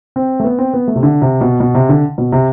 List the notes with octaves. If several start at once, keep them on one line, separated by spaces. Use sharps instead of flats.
C4
A3
B3
C4
B3
A3
C3
D3
C3
B2
B2
C3
D3
B2
C3